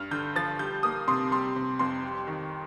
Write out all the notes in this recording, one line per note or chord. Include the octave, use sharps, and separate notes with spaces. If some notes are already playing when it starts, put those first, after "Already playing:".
Already playing: G2 F6
D3 G6
F3 A6
G3 G6
A#3 D#6
C3 C6
G3 C6
C3
F2 C6
G3
D#3